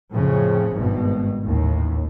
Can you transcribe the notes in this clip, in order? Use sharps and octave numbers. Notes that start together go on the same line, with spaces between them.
F2 A2 C#3
G#1 G2 B2
A1 D#2 A2